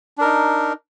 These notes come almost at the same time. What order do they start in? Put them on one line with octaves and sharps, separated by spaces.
D4 A#4 D#4